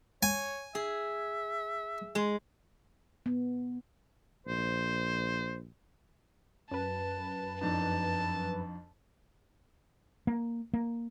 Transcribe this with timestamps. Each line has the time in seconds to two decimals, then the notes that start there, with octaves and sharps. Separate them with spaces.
0.23 C#5 G#5
0.75 G#4 E5
2.15 G#3
3.26 B3
4.47 A#1 C5
6.71 F#2 B4 A5
7.61 F2 D4 D#4 A5
10.27 A#3
10.73 A#3